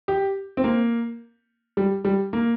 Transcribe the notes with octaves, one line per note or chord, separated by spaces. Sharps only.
G4
C4
A#3
G3
G3
A#3